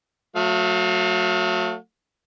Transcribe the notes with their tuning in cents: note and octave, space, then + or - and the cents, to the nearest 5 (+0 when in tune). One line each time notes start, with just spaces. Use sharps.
F#3 -25 A3 +20 F5 +35